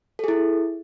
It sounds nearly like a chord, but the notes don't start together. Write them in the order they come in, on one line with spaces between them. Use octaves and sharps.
A4 G#4 E4